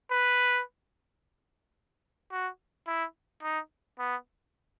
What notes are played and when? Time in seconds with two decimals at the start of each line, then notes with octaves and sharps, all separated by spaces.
0.11 B4
2.32 F#4
2.87 E4
3.43 D#4
3.99 B3